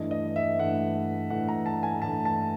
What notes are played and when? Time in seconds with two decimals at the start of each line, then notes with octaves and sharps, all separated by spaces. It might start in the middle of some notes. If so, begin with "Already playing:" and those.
Already playing: G2 E3 A3 D#5
0.11 D#5
0.36 E5
0.59 G2 E3 A3 F#5
1.30 G2 E3 A3 F#5
1.49 A#5
1.66 A5
1.83 G#5
2.02 G2 E3 A3 A5
2.25 A5